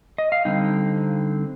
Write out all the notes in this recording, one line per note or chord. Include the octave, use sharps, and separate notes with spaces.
D#5
F5
D3 G3 C4 D#4 G5